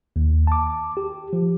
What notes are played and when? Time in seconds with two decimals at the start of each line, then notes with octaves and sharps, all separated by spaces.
0.16 D#2
0.47 A5 D6
0.97 G4
1.33 F3